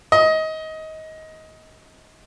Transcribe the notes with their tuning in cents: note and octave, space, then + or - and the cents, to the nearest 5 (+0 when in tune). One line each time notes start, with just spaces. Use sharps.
D#5 +20